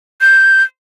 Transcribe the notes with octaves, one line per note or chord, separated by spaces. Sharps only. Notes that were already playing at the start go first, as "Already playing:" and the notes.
G6